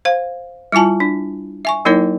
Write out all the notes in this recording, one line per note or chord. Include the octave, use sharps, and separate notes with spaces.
C5 F5
G3 E4 F4 G#5 A5
D4
E5 G#5 C#6
F#3 A#3 D#4 E4 A#4 C#5